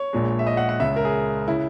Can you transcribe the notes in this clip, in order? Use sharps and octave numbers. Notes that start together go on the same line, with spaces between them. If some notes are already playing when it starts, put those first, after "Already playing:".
Already playing: C#5
A#1 A#2 G#3
E5
D#5
F#5
F#5
C#2 C#3 G#3 E5
A#4
G#4
C#3 E4